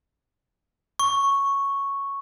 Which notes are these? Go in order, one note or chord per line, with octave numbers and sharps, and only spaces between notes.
C#6